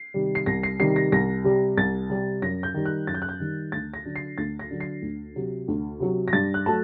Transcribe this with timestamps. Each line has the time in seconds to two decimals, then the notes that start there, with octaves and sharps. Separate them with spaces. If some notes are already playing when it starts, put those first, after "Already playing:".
Already playing: C7
0.14 C3 D#3 G3
0.35 C7
0.46 C2 A#6
0.63 C7
0.80 C3 D#3 G3 C7
0.96 A#6
1.12 C2 A#6
1.44 C3 G3
1.77 C2 A6
2.10 C3 G3
2.42 F#2 A#6
2.63 G6
2.74 D#3 G3
2.85 F#6
3.07 F#2 A6
3.14 G6
3.22 F#6
3.29 G6
3.40 D#3 G3
3.72 D2 A6
3.94 A#6
4.05 D3 F#3
4.16 C7
4.38 D2 A6
4.59 A#6
4.71 D3 F#3
4.80 C7
5.02 D2
5.36 C3 F#3
5.68 D2
6.00 C3 F#3
6.28 A#6
6.33 G2 A6
6.54 F#6
6.66 F#3 A3 A5